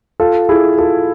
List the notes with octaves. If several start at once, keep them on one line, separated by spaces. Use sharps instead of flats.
F4 A4
E4 G#4
F4 A4